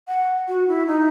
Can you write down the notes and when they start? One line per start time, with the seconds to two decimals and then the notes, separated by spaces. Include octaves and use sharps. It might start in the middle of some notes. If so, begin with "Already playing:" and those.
0.08 F#5
0.48 F#4
0.68 E4
0.87 D#4